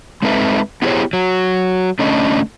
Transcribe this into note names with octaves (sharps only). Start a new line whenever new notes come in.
G#3 C4 D#4 A4 B4 E5
B3 E4 G4 G#4 C5 C#5
F#3
D3 A3 C#4 D4 D#5